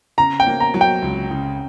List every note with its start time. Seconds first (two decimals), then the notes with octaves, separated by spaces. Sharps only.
0.18 C#3 A#5
0.40 G5
0.47 A#3
0.60 A#5
0.74 F#3
0.81 G5
1.02 C#2
1.31 C#3